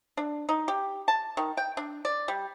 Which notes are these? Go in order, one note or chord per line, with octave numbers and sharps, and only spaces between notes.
D4
D#4
G4
A5
D#3
G5
D4
D5
G3